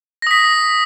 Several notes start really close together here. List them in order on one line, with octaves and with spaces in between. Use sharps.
A#6 D#6 B6